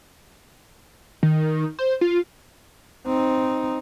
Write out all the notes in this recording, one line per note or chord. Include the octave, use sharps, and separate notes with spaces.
D#3
C5
F4
C4 D#4